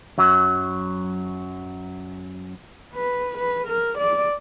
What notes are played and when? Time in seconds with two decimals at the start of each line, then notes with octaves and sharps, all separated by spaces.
0.18 F#2 F#3
2.95 B4
3.38 B4
3.67 A#4
3.98 D5